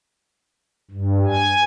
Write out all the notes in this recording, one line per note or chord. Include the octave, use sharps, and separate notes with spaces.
G2
G#5